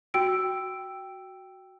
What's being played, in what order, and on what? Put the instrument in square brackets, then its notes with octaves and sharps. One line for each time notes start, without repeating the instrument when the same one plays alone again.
[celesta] F#4 G5 E6 D7